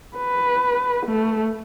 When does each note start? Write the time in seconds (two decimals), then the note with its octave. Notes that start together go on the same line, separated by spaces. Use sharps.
0.17 B4
1.06 A3